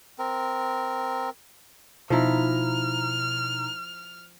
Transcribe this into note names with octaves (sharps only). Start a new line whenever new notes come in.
C4 A#4
B2 F3 D#4 E4 A#5 F6